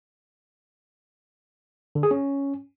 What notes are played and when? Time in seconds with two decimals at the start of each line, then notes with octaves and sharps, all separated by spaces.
1.95 D3
2.03 G#4
2.11 C#4